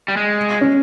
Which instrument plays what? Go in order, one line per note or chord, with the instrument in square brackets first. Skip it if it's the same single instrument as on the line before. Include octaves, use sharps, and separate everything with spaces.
[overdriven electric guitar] G3
G#3
[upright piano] C#4